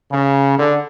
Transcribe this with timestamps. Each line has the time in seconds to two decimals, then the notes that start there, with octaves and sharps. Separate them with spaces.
0.11 C#3
0.58 D3